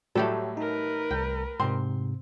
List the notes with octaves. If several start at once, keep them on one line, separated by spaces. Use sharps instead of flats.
A2 F#3 G3 A3 G4 A4
D#4 A#4 B4
C2 G5
G#2 C3 C4 C6